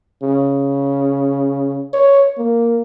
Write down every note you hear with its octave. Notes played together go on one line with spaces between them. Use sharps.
C#3
C#5
A#3